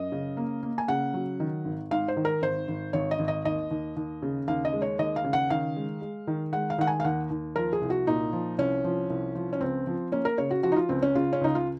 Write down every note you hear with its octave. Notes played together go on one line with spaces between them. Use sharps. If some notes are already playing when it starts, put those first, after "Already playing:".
Already playing: F#2 D#5
C#3
A#3
A#3
G#5
C#3 F#5
F#3
D#3
G#1
G#2 F5
C5
D#3
A#4
G#1 C5
G#1
G#1 C#5
D#5
G#1
D#5
D#2 D#5
D#2
D#2
C#3
D#2 F5
D#5
G#3
C#5
D#2 D#5
F5
C#3
F#5
D#3 F5
G#3
G#3
D#3
G#3 F#5
F5
D#3 F#5
G#5
F5
D#2 F#5
D#2
F3 A#4
G#4
C2
F#4
A#2 D#4
F3
C2 C#4
F3
C2
F3
C#4
C#2 C4
F3
A#3 C#4
A#4
C#3 C#5
F#4
F3 F#4
D#4
F4
C#2 C4
C#4
C#3 F4
C#4
C#2 D#4
F4